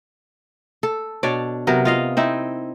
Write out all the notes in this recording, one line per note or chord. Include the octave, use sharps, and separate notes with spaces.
A4
B2 D4 C#5 D5
C3 F#3 B3 A#4
F4 D#5 F5
C4 D#4 E4